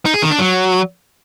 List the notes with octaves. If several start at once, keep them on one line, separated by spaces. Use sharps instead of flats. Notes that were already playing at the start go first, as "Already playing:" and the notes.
D#4
G#4
D#3
D4
F#3